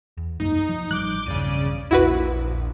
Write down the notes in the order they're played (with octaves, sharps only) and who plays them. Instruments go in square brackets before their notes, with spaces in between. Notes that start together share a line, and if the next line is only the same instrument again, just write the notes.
[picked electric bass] E2
[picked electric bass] C2 F#2 A#3 [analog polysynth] D#4
[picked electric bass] F3
[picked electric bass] A1 F3 G3 [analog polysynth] D6 G6 [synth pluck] F#6
[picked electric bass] B1 E2 G2 [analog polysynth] C#3 D5 D#7
[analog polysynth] A#1 [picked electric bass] E2 [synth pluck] E4 F#4 B4